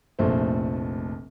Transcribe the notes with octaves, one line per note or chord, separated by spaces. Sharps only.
F1 A#1 A3 C5